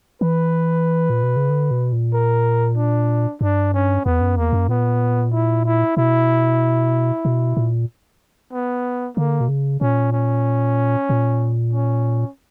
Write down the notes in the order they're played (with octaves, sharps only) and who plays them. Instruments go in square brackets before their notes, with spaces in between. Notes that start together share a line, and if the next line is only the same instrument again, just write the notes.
[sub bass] E3 [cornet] B4
[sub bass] A#2
B2
C#3
D3
B2
A#2
[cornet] A#4
D4
[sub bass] G2 [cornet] D4
[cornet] C#4
[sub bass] E2 [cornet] B3
[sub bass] F#2
[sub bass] E2 [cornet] A#3
[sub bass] F#2
[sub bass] A#2 [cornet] B3
[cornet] E4
E4
[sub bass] B2 [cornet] E4
[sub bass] B2
A#2
[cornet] B3
[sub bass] D3 [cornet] A#3
[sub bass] B2
C#3
[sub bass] A#2 [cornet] C#4
[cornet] C#4
[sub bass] A#2
[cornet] C#4